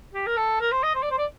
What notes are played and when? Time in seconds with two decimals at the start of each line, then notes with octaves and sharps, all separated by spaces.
0.13 G4
0.27 A#4
0.37 A4
0.61 A#4
0.72 C5
0.83 D#5
0.95 C5
1.03 D5
1.11 C5
1.18 D5